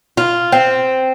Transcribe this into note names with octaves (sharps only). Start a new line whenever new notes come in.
F4
C4